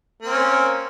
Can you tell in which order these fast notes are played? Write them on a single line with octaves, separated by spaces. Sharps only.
A#3 C4 C#4